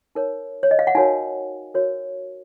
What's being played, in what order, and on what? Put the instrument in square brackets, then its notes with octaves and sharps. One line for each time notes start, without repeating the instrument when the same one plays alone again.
[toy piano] D#4 A#4 C#5
C#5
D#5
F5
F#5
D#4 F#4 A#4 C#5 F5 G#5
F#4 A#4 C#5